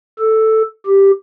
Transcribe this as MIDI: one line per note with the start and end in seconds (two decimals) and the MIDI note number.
0.19 0.62 69
0.86 1.11 67